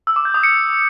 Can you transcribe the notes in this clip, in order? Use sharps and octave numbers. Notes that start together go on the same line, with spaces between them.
E6
D6
G6
D#6
C#7